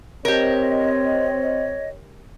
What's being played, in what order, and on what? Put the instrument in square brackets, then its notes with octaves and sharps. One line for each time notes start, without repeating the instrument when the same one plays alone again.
[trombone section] C4 [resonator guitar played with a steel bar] G4 A#4 [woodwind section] C#5 D#5